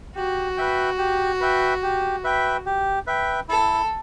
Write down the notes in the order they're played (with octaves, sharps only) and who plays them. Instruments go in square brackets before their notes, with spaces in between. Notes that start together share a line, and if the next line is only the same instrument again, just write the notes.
[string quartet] F#4 [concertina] G4
[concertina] B4 E5 G5
G4
B4 E5 G5
G4
B4 E5 G5
G4
B4 E5 G5
[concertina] E4 [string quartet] A4